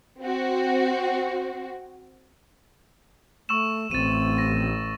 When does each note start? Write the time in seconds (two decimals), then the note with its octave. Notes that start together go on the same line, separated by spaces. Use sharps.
0.21 C4 F#4
3.49 A3 C#6 E6 E7
3.91 A1 C4 A6 D#7
4.38 A#6